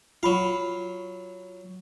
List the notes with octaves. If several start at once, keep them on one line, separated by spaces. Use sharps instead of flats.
F#3 F4 F5 B5